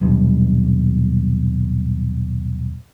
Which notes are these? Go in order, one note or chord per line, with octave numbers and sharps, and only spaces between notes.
D#1 B1 G2 E3